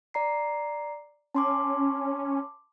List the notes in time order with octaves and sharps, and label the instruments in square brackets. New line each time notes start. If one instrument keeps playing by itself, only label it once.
[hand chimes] D5 A#5 C7
[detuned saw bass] C#4 [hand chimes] A5 C6 D6